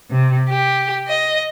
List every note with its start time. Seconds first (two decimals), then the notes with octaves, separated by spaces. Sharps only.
0.12 C3
0.48 G4
1.07 D#5